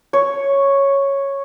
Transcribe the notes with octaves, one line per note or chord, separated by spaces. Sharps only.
C#5